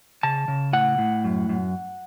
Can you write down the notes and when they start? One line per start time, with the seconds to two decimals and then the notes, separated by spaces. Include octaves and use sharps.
0.23 C#3 A5
0.48 C#3
0.73 A2 F#5
0.98 A2
1.24 F#2
1.49 F#2